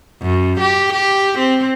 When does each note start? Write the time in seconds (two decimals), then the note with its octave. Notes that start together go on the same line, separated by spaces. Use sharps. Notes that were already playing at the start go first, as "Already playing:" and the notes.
0.22 F#2
0.60 G4
0.93 G4
1.39 C4